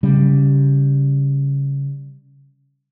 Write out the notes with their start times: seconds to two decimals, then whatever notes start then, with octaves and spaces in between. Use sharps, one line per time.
0.03 C#3 G3